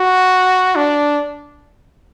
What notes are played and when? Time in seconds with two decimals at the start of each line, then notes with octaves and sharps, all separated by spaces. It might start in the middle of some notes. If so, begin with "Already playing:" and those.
Already playing: F#4
0.75 D4